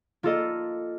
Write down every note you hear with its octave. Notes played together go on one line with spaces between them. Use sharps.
A#3 F4 A4 D#5